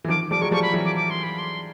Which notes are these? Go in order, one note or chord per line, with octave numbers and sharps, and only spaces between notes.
E3
D#3 F3 D6
F3 G3 D6
F#3 G#3 C#6
F3 G3 C#6
B5
E3 F#3
D6
D6
C6
B5
C6